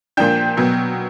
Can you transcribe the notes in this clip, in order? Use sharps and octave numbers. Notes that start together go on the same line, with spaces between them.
A#2 F3 A#3 D4 G5 G6
B2 F#3 B3